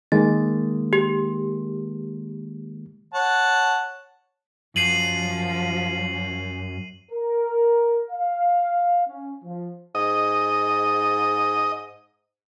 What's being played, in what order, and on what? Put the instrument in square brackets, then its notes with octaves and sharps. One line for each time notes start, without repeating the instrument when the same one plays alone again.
[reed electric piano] D#3 G#3 A#3 [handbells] A6
[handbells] G4
[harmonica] C#5 F#5 A5
[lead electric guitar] F#2 [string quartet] F3 [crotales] C7 D#7 F#7
[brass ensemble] A#4
F5
C#4
F3
[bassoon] G#2 [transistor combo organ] D#5